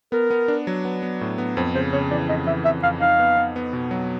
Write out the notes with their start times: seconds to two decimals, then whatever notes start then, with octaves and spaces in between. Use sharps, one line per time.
0.12 B3 A#4
0.30 B3
0.48 D4
0.67 F#3
0.85 B3
1.03 B3
1.21 A2
1.38 B3
1.57 F2 C5
1.75 C#3 C5
1.93 C#3 C#5
2.11 E3 D5
2.29 F2 D#5
2.47 E3 E5
2.65 F2 E5
2.83 F2 F5
3.01 D#4 F5
3.19 B3
3.37 B3
3.56 B3
3.73 B2
3.91 F#3